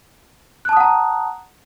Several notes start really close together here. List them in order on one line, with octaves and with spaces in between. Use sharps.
F#6 A5 D#6 F#5 A#5